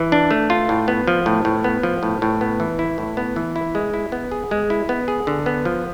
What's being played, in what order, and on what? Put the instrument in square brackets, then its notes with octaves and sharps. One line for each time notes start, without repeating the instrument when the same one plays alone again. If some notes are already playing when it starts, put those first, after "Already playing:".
Already playing: [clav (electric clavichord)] E3
D4
A3
F4
A2
B3
F3
A2
A2
B3
F3
A2
A2
B3
E3
E4
A2
B3
E3
E4
G#3
E4
B3
G#4
G#3
E4
B3
G#4
D3
B3
F3